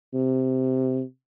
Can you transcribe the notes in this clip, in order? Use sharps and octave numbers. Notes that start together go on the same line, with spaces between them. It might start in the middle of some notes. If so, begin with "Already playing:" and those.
C3